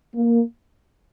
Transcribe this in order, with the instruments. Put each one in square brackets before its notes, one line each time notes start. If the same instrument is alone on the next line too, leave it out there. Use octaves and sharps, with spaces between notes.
[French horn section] A#3